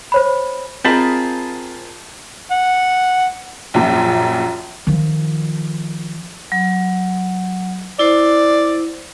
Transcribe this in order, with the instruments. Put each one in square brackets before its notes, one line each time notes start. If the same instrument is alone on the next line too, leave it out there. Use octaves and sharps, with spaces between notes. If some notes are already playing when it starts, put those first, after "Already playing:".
[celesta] C5 C#5 B5
[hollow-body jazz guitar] C4 D#5 [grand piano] F4 G#4 A#4 [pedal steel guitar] G5 A5 B5
[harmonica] F#5
[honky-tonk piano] A#1 F#2 A#2
[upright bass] D#3 F3
[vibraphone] F#3
[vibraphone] E4 C5 [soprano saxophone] D5